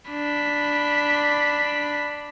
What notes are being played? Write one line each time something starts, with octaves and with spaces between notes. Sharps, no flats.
D4 B5